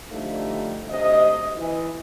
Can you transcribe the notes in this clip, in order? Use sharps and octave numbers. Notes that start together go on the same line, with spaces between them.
D3 F3 G3 A3 D#4
D2 C3 D#5
E3